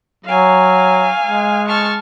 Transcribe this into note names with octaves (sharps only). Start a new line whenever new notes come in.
F#3 F5 G#5
G#3
A5 C#6 F6